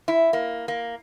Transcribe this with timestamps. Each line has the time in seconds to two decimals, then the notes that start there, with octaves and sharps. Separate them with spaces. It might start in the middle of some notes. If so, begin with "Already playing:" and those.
0.08 E4
0.33 A#3
0.68 A#3